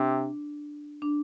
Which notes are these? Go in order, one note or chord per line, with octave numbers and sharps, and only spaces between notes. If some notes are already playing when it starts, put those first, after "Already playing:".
Already playing: C3 D4
D4